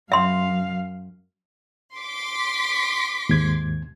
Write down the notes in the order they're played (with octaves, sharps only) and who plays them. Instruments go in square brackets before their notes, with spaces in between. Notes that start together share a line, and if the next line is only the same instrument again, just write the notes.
[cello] F#2 F5 [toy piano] E5 C6
[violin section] C6 D6 B6
[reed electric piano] D#2 G#2 G#6